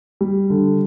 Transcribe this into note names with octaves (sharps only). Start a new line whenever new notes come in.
G3
D3